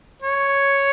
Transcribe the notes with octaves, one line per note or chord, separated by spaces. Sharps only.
C#5